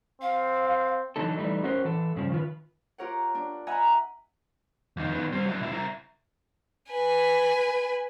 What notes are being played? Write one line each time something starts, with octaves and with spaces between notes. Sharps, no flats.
C4 F5
D3 E3 F#3 A3 D#4 A4
E3 G3 A3 D#4
C#4 F#4 A#4 C5
E3 A4
G2 C#3 F3
D#3 F4 B4
F4 G4 A#4 C#5 F#5
D4
D#5 E5 F#5 G#5 A#5 B5
F2 D#3
D#3 B3
G3 C4
F#3 E4
B1 E4
E4 A#4
B4 G#5